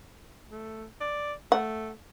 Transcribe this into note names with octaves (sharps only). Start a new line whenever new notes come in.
A3
D5
A3 F#5